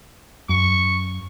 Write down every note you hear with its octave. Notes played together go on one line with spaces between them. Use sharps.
F#2 C#6